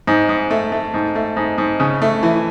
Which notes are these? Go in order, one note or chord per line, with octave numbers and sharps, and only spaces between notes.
G#2
G#2
A3
A3
G#2
A3
G#2
G#2
C#3
A3
E3